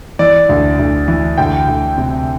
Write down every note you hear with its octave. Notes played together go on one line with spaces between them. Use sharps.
E3 D5
D2
D2
E3
D2 G5
D2
C3